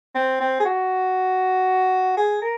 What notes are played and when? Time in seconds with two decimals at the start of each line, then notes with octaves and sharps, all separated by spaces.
0.15 C4
0.40 C4
0.60 G#4
0.65 F#4
2.17 G#4
2.42 A#4